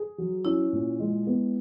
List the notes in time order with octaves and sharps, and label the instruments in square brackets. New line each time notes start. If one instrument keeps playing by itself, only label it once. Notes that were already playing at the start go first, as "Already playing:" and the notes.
Already playing: [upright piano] G#4
F#3
[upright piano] C#4 [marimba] E4
[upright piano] A#2
G#3
B3